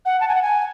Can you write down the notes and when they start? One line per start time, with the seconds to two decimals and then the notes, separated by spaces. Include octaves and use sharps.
0.06 F#5
0.20 A5
0.28 G#5
0.35 F#5
0.42 G#5